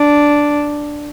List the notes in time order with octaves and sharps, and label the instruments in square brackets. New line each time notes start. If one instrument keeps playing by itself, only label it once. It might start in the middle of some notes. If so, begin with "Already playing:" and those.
Already playing: [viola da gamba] D4